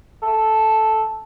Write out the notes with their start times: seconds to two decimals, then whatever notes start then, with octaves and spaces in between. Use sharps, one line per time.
0.22 A4